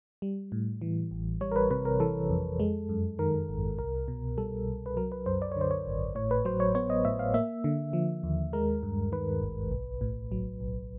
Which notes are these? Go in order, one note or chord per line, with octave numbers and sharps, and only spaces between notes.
G3
A2
E3
A1
G3 C#5
A#4
B4
C3 B4
A#4
E3 A4
F2
G#3
F#2
D#3 A#4
G#1
C2 A#4
B2
G3 A4
C2
B4
F#3 A#4
B4
F#2 C5
D5
C#5
D3 C5
C#5
G#1
A2 C#5
B4
F#3 C5
C#5
B3 C#5
D#5
A2 E5
F5
A#3 E5
D3
F3
D#2
G#3 A#4
G2
D#3 B4
G#1
B1
A2
F#3
B1